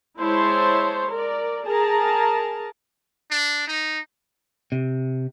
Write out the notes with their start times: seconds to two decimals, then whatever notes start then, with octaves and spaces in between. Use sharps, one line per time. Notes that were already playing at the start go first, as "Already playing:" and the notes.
0.19 G#3 E4 C5 C#5 A5 C6
1.11 A#4 D5
1.65 G#4 A#4 A5 A#5
3.31 D4
3.67 D#4
4.72 C3